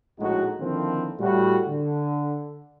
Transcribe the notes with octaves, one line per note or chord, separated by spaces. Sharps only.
A#1 A2 G#3 D#4 F#4
D3 D#3 F3 A#3 C4 E4
A2 G3 F#4
D3